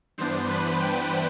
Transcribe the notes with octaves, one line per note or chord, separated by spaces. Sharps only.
G2 E3 B3 D4 C5
B4
G5